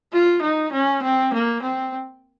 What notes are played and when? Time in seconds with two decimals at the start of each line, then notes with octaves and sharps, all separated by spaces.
0.13 F4
0.42 D#4
0.72 C#4
1.03 C4
1.33 A#3
1.62 C4